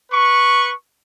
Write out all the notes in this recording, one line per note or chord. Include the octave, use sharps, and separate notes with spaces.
B4 C#6